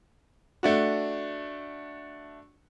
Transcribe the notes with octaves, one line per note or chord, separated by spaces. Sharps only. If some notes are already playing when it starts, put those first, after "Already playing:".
A3 D4 F#4